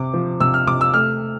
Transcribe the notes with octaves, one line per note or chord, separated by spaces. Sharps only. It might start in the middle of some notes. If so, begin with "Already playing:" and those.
Already playing: C3 D6
F3
C3 E6
F6
C3 D6
E6
A3 F6